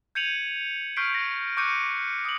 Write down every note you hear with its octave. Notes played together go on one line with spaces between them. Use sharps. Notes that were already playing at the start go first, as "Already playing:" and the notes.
G6 G#6 C#7 D#7 F7 F#7
C#6 F6 G6 B6 C7 D7
A#6
C#6 D6 F#6 G6 C#7 D#7
D#6 F#7